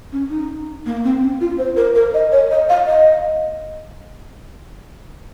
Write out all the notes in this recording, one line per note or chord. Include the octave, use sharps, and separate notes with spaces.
C#4
D#4
A#3
C4
C#4
F4
C5
A#4
A#4
D#5
C#5
D#5
F5
D#5